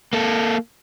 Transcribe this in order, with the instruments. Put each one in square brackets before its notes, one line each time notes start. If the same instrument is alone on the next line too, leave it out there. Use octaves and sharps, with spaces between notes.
[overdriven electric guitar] A#3 A4